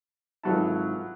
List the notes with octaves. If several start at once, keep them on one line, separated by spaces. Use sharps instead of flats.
G#1 F3 F#3 E4 A4 A5